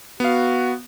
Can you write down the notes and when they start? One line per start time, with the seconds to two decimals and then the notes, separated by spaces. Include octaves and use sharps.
0.20 B3 F#4 F5